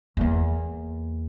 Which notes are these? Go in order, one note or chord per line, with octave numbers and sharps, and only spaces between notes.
E2 A#3